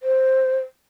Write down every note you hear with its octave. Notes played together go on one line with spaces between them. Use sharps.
C5